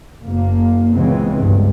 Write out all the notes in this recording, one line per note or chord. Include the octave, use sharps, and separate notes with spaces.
F#1 A#3
C#2 C#3 E3 G#3 B3 C4
C#2 G2